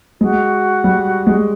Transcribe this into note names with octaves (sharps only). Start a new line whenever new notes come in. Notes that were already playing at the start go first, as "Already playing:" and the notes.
G#3 F#4
G3
G#3